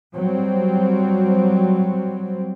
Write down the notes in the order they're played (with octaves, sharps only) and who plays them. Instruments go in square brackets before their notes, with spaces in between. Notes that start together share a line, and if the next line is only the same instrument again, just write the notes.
[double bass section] F#3 G3 C4